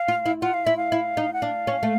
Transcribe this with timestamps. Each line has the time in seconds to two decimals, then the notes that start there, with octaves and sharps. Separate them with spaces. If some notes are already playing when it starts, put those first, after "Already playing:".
Already playing: F5
0.08 F4
0.26 E4
0.42 F4 F#5
0.54 F5
0.65 E4 E5
0.77 F5
0.92 E4
1.17 D#4
1.33 F#5
1.42 D4 F5
1.67 C#4
1.83 A3